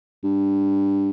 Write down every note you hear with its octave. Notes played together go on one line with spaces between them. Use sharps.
G2